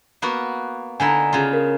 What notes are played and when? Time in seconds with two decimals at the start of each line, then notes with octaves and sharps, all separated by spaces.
0.22 A#3 B3 F#4
1.00 D3 D#4 E4 G#5 A#5
1.33 C#3 F4
1.53 A#4